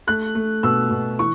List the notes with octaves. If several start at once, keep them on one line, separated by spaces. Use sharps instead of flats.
A3 F#6
A3
B2 E6
B2
E3 C#6